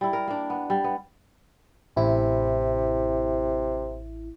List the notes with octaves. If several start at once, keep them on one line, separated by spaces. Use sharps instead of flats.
G3 E4
A#4
A#3 D4
B3
G3
B3
A1 C3 E4